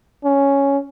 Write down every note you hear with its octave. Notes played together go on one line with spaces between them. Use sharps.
C#4